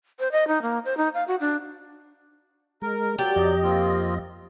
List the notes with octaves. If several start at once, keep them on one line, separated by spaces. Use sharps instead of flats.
C5
D#5
D#4
A#3
C5
D#4
F5
F#4
D4
G#3 A#4
F#3 G4 D5
F2 D#5
A#3 C4 F4